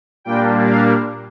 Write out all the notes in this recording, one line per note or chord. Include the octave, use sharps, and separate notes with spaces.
A#2 G3 A#3 D4 G5
F5